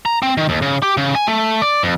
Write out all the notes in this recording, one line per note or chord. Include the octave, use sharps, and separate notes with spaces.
A#5
C4
D#3
D#2
C#3
G4
C#3
G#5
A3
D5
F2